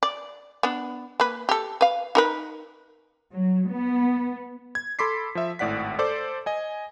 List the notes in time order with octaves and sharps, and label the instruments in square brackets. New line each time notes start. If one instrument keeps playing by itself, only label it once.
[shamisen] D5
B3 D4
A#3 B4
G4 A4
B4 F5
D#4 A#4 B4
[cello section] F#3
B3
[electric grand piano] G#6
A4 B5 C6 D6 B6 C7
F3 E5
G#1 A2 D5 F#5 B6
A4 C5 D5 D6
D#5 G#5